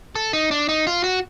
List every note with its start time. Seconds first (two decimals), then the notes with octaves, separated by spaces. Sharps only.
0.15 A4
0.33 D#4
0.51 D4
0.69 D#4
0.87 F4
1.04 F#4